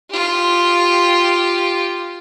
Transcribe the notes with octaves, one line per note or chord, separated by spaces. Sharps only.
F4 G4